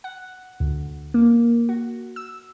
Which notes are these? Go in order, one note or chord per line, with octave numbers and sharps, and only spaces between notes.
F#5
D2
A#3
F#4
E6